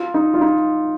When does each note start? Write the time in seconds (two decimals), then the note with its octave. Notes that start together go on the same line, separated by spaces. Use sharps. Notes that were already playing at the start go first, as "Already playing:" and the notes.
Already playing: F4
0.14 D#4
0.34 F4
0.41 D#4